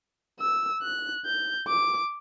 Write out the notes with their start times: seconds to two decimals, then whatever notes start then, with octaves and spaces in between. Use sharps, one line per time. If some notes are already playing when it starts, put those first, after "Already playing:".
0.40 E6
0.82 F#6
1.25 G6
1.68 D6